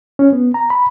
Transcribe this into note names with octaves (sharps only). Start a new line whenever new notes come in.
C#4
B3
A#5
B5